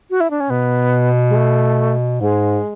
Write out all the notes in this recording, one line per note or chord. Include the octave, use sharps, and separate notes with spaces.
F#4
E4
D4
C#4
B2 B3
G#3
A3
G#2 G#3